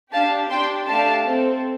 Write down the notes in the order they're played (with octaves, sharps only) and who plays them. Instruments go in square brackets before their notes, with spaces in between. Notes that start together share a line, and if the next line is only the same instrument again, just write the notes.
[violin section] D4 G4 F5 A5
D4 G4 G5 C6
A3 D4 G4 F5 A5
C4 A4